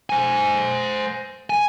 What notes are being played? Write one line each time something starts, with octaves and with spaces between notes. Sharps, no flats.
C5 G#5
G#5